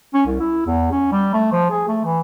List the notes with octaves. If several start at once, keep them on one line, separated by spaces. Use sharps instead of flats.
C#4
C2
E4
E2
C#4
G3
A3
F3
G#4
A3
E3